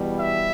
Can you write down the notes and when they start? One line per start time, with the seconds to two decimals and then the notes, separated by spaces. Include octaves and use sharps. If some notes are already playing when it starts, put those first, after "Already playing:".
Already playing: E2 B2 G3
0.19 E5